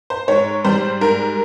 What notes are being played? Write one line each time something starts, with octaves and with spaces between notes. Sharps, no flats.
C5
G#2 C#5
G3 C5
G#2 A#4